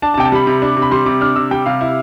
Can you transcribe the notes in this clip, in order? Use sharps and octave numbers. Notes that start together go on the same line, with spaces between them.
D4 A5
A5
C3 G5
A5
G3 B5
C3
D4
C3
B5
G3 C6
C3 D6
D4 F6
C3 E6
G3 G5
C3 F5
E4